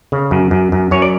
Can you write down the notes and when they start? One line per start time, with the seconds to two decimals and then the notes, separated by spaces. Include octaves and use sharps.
0.12 C#3
0.31 F#2
0.51 F#2
0.72 F#2
0.91 F#2 C#5
1.02 D5